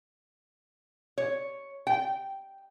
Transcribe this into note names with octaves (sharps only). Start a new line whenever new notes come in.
C#5
G5